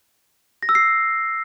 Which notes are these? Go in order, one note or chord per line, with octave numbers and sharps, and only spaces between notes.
A#6
E6
C7